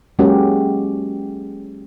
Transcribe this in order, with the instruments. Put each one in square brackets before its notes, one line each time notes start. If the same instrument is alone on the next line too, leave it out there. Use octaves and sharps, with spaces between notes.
[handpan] F#3 G#3 A#3 C#4 F#4 G4